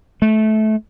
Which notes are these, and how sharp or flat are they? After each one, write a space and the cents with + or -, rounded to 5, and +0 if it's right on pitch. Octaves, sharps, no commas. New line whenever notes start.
A3 -20